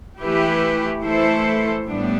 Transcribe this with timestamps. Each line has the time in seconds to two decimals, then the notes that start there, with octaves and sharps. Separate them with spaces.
0.20 E3 A3 E4 G4 B4
1.03 E3 A3 E4 A4 C5
1.85 A2 G3 B3 D4